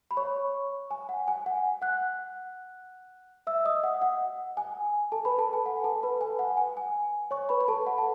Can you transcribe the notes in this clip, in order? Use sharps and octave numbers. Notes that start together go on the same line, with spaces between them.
B5
C#5 C#6
G#5
F#5
G#5
F#5
F#5 F#6
E5 E6
D#5 D#6
F#5
F#5
G#5
A4 A5
B4 B5
A4 A5
G#5
F#5
A4 A5
B4 B5
G#5
F#5
G#5
G#5
C#5 C#6
B4 B5
B5
A4 A5
F#5
A5